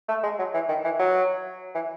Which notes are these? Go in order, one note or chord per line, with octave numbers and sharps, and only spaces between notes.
A3
G#3
F#3
E3
D#3
E3
F#3
E3